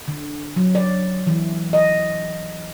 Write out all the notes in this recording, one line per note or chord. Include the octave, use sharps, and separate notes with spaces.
D3
F#3
D5
E3
D#5